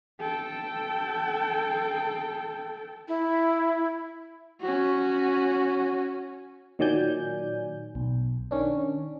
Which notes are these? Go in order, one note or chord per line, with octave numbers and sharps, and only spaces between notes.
A4 G5
E4
C#4 F#4
A#2 D#3 F#3 D5 G#5 G6
B1
D#3 C#4 D4